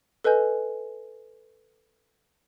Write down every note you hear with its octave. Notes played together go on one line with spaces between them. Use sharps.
A4 B4 D#5 G#5 G6